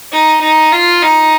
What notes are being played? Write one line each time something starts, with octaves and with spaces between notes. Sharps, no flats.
D#4
D#4
F4
D#4